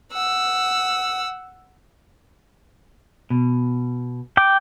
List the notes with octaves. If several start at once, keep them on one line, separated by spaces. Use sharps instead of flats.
F#5 E6
B2
G5 D6